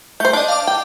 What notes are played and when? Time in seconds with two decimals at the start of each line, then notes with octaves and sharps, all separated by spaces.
0.20 A3 C5 G6
0.33 D4 D5 D#5
0.48 F5 A5 D6
0.67 G5